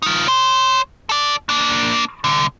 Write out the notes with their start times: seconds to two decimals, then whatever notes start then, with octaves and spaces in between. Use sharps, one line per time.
0.02 D#4 F4
0.27 C#5 C6
1.09 A4 D5
1.49 A#3 D4
2.24 C2 D3